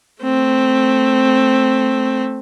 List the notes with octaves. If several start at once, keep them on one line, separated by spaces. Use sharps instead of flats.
A3 C4